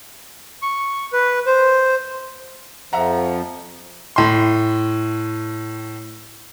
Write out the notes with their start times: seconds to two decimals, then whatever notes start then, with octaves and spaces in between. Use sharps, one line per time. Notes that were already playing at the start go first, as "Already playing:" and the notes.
0.62 C#6
1.13 B4
1.46 C5
2.93 F2 F3 E5 F#5 A#5
4.16 A2 C6